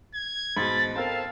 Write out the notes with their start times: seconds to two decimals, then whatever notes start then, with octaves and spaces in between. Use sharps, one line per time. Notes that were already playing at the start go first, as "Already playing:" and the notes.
0.14 G#6
0.57 G#2 B2 B5 A6
0.96 C4 A4 A#4 F5 A5